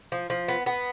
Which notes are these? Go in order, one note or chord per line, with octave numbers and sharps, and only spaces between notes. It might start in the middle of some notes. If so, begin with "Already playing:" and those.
F3
F3
B3
B3